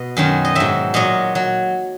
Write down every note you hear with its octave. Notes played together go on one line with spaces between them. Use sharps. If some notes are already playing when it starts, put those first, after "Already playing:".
Already playing: B2 D#5
F#2 D#3 F#3
D#5
G#2 F#3 E5
A#2 F#3 D#5
F#3